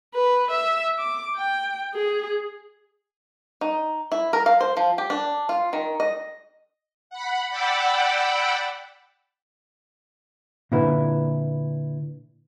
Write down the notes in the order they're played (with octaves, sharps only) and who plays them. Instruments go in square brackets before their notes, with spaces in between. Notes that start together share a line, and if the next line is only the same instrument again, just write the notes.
[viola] B4
E5
D6
G5
G#4
[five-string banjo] D#4
E4
A#4
F5
C5
F3
G4
D4
F4
D#3
D#5
[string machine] F#5 B5
D5 F#5 G5 B5 D6 E6
[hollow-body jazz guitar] A#2 D3 E4 B4